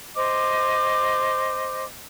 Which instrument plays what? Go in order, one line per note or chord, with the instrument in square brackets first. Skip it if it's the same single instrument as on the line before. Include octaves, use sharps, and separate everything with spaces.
[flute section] C5 D#5 D6